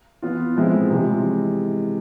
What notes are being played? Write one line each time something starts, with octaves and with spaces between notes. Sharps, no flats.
E3 B3 F4
A2 F3 G#3 C4 E4
C3 E3 G#3